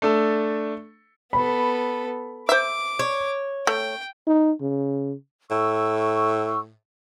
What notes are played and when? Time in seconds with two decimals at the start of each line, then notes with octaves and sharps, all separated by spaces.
0.02 A3 D4 A4
1.33 B3 A4 B5
2.49 C5 E5 D6
2.99 C#5
3.67 A3 G5
4.27 D#4
4.61 C#3
5.51 A2 C#6 E6